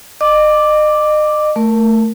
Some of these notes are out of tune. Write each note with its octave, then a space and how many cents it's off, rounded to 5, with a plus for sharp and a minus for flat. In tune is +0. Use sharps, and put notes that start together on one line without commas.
D#5 -35 D6 +0
A3 +10 A#4 +0